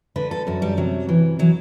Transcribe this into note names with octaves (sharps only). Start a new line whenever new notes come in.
D3 B4
A4
F#2 F#4
G3
C3 F#3
E3
E3 F#3